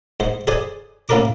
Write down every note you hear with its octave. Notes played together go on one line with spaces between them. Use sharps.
G#2 C5
G#4 A4 C5 D5 G#5
A2 A#3 C#4 A4 A#4 D6